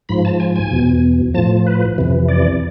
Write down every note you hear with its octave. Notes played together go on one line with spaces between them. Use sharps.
G#2 F3 B5
A5
G#5
G#5
E2 B2
A2 F3 A5
B4
F2 C3 E3
D5